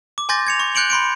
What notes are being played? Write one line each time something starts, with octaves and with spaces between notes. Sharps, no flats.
D6
G#5 C6 D6 G6 A6 A#6
G#6 C#7 F7
C#6
F#6 G6 C#7 D7 F#7
B5 C6 C#7 D7